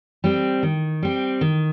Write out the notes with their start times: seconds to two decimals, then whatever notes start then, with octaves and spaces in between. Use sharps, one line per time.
0.24 G3 C4
0.63 D#3
1.02 G3 C4
1.41 D#3